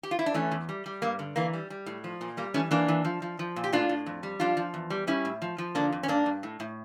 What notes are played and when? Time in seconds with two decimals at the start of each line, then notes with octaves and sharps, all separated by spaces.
0.03 G4
0.11 F4
0.19 E4
0.26 D4
0.34 E3 A3 C#4
0.51 E2
0.69 G3
0.86 G3
1.02 G2 A#3
1.19 D3
1.36 E3 A#3
1.53 G3
1.70 G3
1.86 A2
2.04 F3
2.21 A#2
2.37 G3 A#3
2.54 E3 A3 C#4
2.71 E3 A#3 D4
2.88 E3
3.05 F3
3.22 F3
3.39 F3
3.56 A#2
3.64 G4
3.72 A2 D4 F4
3.89 A2
4.06 F2
4.23 G3
4.40 F3 D4 F4
4.57 F3
4.74 E2
4.90 G3
5.07 G3 C#4 E4
5.25 A2
5.42 F3
5.58 F3
5.75 D3 A#3 D4
5.92 F2
6.03 C#4
6.08 G2 A#3 D4
6.26 G2
6.43 A2
6.60 A2